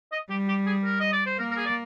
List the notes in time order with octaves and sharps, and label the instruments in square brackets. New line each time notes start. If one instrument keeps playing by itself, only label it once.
[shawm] D#5
[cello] G3 [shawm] G4
[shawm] G4
G#4
A#4
D#5
D5
C5
[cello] A#3 [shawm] A#4
[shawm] A#4
G#4
D5